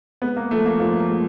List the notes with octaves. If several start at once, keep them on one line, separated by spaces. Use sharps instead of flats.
G#3 B3
A#3
F3 A3
A#3
F3 A#3
A#3
G#3